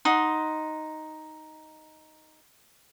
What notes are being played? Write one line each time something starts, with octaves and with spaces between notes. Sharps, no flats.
D#4 F#5 C6